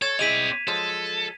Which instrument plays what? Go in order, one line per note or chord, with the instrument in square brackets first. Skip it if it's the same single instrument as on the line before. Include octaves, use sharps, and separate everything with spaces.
[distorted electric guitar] A4 [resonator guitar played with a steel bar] C#5 [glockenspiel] G#6 E7
[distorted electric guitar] C4 D5 [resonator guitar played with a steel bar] E4 G#4 D#5 [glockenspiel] B6 D#7 F7
[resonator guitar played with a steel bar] F3 F#3 G#3 [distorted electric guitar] A4